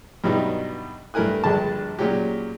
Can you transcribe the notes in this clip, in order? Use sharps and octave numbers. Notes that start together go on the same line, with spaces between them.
G2 B2 F#3 G3 D#4 E4
G2 A3 E4 A#4 G#5 F#6
A#1 G2 D3 G#3 A5
A#2 F#3 G#3 C#4 G4